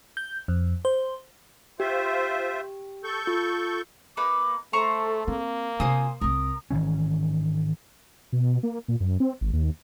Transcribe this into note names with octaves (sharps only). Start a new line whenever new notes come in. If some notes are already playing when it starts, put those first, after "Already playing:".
G6
F2
C5
F4 G4 C5 E5
A4 C#6 G6
F4
A#3 D#4 B4 D6
A3 A4 C5 A#5 C#6
A#3 C4
C3 F4 C5 G#5 D#6
C2 C4 A#4 D#6
G#1 D#3 E3 C#4
B2
A#3
A#2
F#2
C4
G#1
D#2